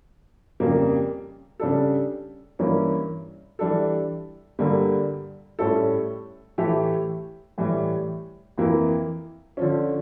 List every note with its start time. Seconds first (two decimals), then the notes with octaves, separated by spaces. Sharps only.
0.60 F2 C#3 G3 A#3
1.59 C#3 G3 D4 A4
2.59 G2 E3 A#3 C#4
3.59 E3 G3 D4 A4
4.59 G2 D3 G3 A#3
5.59 A2 G3 C#4 E4 A4
6.58 A2 E3 A3 E4 G4
7.58 A2 E3 G3
8.58 F2 E3 A#3 E4
9.57 D3 F3 C#4